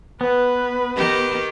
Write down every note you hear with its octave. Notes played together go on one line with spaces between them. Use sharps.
B3 B4
D#3 G4